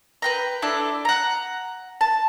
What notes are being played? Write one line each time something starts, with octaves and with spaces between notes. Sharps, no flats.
B4 G5 A#5
D4 E4 A4
F#5 A#5
A5